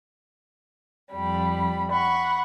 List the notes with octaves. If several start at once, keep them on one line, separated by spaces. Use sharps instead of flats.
F2 G3 B5
F#5 B5 C#6